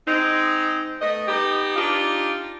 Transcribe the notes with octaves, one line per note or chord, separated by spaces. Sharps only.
G#3 C4 D#4
A3 B3 D#5
B3 D#4 G4
D4 D#4 F4 G4